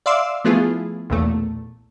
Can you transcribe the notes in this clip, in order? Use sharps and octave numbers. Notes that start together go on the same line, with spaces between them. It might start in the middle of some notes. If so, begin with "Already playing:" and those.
D5 E5 F5 C6 D6 E6
F3 A3 B3 E4 F4 G#4
B1 E2 A#2 A3